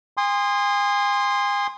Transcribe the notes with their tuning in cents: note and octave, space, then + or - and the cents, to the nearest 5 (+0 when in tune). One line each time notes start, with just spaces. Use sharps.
G#5 -35 C6 +0 D#6 -15